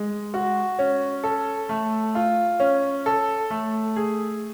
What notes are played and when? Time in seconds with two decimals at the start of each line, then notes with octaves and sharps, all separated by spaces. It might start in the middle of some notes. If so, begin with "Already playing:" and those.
Already playing: G#3
0.34 F#4
0.79 C#4
1.23 A4
1.69 A3
2.15 F4
2.60 C#4
3.06 A4
3.50 A3
3.96 G#4